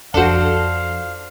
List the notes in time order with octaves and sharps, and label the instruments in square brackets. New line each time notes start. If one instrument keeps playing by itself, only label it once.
[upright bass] F2 F3 [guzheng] D4 C5 [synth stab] F#4 A4 [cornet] F5